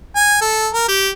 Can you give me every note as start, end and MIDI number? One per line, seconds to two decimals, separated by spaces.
0.15 0.37 80
0.41 0.68 69
0.74 0.85 70
0.88 1.09 67